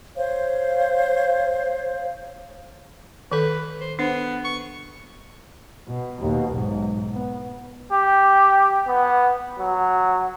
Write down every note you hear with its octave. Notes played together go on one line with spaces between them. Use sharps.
C5 C#5 F5
D#3 A4 B4
C5
B3 D4 C5
C#6
B2
D#2 B2
B1 G#2
B3
G4
B3
F#3